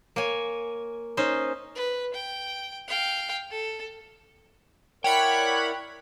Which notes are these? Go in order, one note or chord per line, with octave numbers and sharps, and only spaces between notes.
A#3 C#5 G#5
C#4 D#4 C5
B4
G5
F5 G5
A4
E4 A#4 C#5 D5 F#5 G5 B5